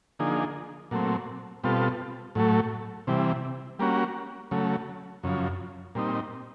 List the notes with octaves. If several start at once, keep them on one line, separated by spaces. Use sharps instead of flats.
D3 F3 A#3 D#4 G#4
A#2 F#3 A3 C4
B2 G3 C4 F4 A4
A2 F#3 A3
C3 E3 G3
G3 A#3 C#4 F#4
C#3 F#3 A3
F#2 C#3 F3
A#2 G3 C4 D#4